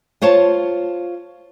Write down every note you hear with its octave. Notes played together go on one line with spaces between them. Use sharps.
F4 C5 C#5 F5 A5